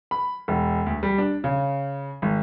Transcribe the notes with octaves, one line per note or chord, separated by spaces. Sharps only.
B5
E1
D2
G3
D4
C#3
G#1